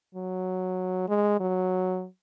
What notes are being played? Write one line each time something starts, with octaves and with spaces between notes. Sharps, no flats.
F#3
G#3
F#3